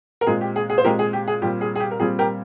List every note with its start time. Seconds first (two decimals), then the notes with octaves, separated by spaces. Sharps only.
0.21 A#4
0.27 A#2 G#3 C4 G#4
0.41 G4
0.56 G#4
0.70 G#4
0.78 C5
0.84 A#2 G#3 C4 G4 A#4
0.99 G#4
1.13 G4
1.28 G#4
1.42 A#2 G3 C4 G4
1.61 G#4
1.76 G#4
1.80 G4
1.91 A#4
2.00 A#2 G3 C4 G#4
2.19 G4 A#4